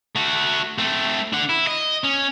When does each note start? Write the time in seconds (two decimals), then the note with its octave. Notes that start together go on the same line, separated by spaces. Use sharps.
0.15 A3 F#4
0.78 A3 C4
1.33 D4 F#5
1.49 E4
1.67 D#5
2.04 C#4